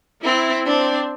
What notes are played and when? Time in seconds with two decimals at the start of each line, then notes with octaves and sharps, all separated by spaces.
0.24 C4 E4
0.66 C4 D4